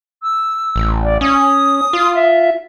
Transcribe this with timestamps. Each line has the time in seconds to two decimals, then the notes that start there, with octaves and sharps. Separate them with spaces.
0.23 E6
0.76 A1
1.03 D5
1.21 C#4 D#6
1.93 F4
2.15 E5